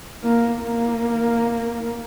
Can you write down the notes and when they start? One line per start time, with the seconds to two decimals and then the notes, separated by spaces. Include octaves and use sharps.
0.23 A#3
0.61 A#3